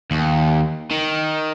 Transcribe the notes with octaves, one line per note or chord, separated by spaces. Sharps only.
D#2
D#3